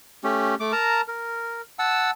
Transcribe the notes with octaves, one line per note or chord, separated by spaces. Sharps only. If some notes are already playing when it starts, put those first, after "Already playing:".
A3 C#4 G4
A3 D6
A#4 A5 A#5
A#4
F#5 A5 E6